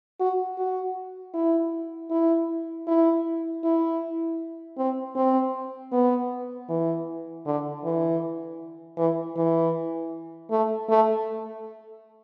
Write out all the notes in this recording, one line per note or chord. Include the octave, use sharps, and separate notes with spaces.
F#4
F#4
E4
E4
E4
E4
C4
C4
B3
E3
D3
E3
E3
E3
A3
A3